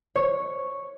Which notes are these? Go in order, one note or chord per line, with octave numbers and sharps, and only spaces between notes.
C#5